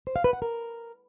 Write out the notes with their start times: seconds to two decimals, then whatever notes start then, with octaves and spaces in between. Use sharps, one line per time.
0.07 C5
0.16 F5
0.24 B4
0.33 F#5
0.42 A#4